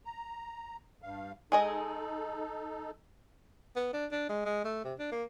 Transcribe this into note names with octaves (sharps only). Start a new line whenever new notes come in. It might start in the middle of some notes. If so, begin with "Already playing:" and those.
A#5
G2 F5
G#3 D#4 G#4 A4 D#5
B3
D4
D4
G#3
G#3
A3
C3
D4
A#3